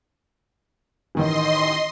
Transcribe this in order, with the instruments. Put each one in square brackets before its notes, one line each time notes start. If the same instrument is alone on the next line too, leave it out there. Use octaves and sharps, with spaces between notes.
[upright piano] A1 D#3 E3 [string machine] D#5 C6